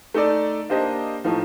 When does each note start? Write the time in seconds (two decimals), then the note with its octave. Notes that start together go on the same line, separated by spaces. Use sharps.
0.14 A3 D#4 A4 D5
0.70 A#3 D4 G4 C5 D#5
1.25 A2 F3 A3 D#4